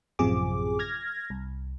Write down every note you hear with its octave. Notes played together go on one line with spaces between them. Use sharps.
A1 F#2 C3 F3 G#4 D6
F6 G#6 A#6
C2